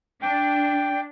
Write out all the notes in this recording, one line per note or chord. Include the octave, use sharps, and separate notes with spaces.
D4 G5